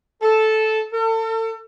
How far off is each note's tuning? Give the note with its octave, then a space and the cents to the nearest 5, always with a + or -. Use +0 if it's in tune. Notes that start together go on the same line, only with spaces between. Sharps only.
A4 -10
A4 +35